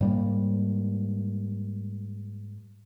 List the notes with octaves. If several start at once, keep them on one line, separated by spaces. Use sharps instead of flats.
G#2 G3 A#3